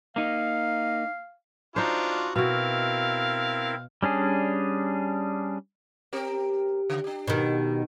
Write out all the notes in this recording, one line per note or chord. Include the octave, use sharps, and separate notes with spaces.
A#3 D#4 F5
D4 D#4 F4 F#4 C5
B2 C4 E4 F#4 A#4 F5
G3 C#4 D4 G#4
C4 G4 A#4
C#3
D4 G4
B2 D#3